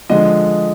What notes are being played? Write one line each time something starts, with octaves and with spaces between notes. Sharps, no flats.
D3 F3 G#3 D#5